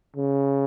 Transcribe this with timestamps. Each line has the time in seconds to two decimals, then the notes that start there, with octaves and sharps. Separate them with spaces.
0.16 C#3